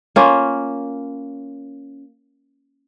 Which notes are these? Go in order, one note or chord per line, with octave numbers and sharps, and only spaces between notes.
A#3 C#4 F4